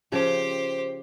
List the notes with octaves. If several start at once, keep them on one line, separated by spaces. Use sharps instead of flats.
C#3 F3 G4 C5